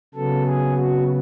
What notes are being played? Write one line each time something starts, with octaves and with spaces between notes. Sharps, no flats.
C#3 F#3 B3 A4
G#4
F#4